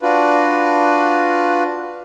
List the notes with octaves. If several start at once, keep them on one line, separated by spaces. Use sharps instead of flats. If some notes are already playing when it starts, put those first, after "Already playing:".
D4 F4 F#4 B4